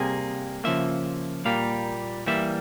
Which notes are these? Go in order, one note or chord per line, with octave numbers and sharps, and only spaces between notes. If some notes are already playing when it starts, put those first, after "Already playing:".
Already playing: C3 G3 A#3 G#4
C#3 F3 A#3 E5
A#2 G3 A#3 F5
E3 G3 A#3 E5